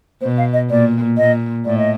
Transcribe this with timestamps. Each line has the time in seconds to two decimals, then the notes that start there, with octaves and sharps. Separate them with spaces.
0.21 B2 C5
0.38 F5
0.53 D#5
0.70 A#2 D5
1.17 A#2 D#5
1.65 A2 D5
1.78 D#5